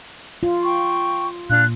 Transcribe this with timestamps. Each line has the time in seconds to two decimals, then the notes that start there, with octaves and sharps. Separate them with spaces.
0.43 F4
0.63 G5 C#6
1.50 A#2 D4 F5 F#6